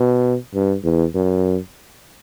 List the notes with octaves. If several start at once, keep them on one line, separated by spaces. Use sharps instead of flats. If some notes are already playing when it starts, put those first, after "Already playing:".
Already playing: B2
G2
E2
F#2